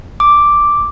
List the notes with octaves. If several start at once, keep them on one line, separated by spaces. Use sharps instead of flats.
D6